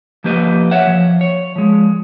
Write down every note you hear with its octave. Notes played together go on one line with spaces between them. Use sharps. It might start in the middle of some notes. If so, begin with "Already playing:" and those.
F3 A#3 G4 B4 D#5
C#5 E5 F#5
F3
C#5
F3 G#3